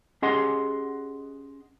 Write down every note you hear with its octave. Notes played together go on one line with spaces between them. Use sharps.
C#4 G4 G#4 D#5 F#5 C6